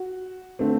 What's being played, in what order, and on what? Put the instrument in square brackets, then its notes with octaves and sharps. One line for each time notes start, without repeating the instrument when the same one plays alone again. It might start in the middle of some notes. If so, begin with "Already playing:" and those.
Already playing: [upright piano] F#4
D3 A3 C4